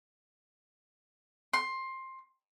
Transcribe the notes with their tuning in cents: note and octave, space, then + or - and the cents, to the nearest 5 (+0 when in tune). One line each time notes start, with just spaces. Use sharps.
C6 +15